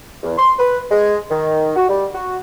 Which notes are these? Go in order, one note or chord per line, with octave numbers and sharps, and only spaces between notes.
E2
C6
B4
G#3
D#3
F#4
G3
F#4